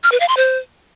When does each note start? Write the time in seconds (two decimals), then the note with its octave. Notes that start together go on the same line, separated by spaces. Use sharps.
0.04 F6
0.12 B4
0.20 F5
0.29 C6
0.37 C5